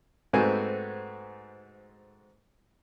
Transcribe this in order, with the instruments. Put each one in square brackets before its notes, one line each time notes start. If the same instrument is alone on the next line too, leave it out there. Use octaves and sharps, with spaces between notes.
[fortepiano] G#2 A3 B3 C4 F#4 G#5